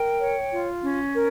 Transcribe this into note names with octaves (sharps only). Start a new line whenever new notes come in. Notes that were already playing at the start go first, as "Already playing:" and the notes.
Already playing: A#4 G5
C#5
F4
C#4
A#4